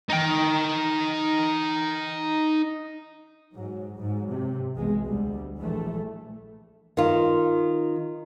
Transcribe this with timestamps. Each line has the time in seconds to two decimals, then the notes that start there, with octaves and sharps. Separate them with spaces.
0.09 D#4 G5
3.54 G#2 F#3
3.98 G#2 F#3
4.30 C3
4.75 B1 E2 B2 G#3
5.04 D2 G3
5.58 A#1 A#2 E3 A3
6.97 D#3 F4